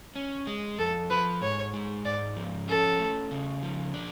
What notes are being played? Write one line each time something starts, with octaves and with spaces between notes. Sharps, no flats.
C#4
G#3
F2 A4
F3 B4
G#2 C#5
G#3
G#2 D5
F3
C#4 A4
A3
C#3
F3
D4